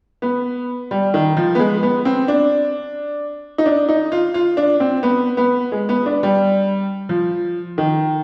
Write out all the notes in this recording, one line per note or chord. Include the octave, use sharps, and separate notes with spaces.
B3
G3
D#3
F3
B3
G#3
B3
C4
D4
D#4
D4
D#4
F4
F4
D4
C4
B3
B3
G#3
B3
D4
G3
F3
D#3